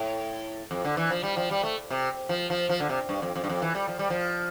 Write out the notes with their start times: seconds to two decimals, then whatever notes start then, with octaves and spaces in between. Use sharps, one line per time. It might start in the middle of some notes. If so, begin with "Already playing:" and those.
Already playing: A2
0.71 F2
0.85 D3
0.97 E3
1.10 F3
1.23 G3
1.37 F3
1.51 G3
1.63 A3
1.91 C3
2.29 F3
2.50 F3
2.69 F3
2.80 D3
2.89 C3
3.09 G2
3.22 F2
3.36 F2
3.44 G2
3.49 F2
3.62 E3
3.75 G3
3.88 F3
3.99 G3
4.10 F3